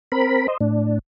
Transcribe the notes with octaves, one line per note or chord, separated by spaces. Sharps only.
C4 A#4 B5
C5 D#5
A2 D4